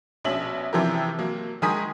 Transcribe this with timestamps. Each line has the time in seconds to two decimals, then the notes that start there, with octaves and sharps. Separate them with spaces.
0.24 A#1 B2 C#4 E5 F#7
0.73 C3 E3 F3 G4 A#4
1.19 F#3 A#3
1.62 D#3 G#3 A#4 G#5 D#6 B6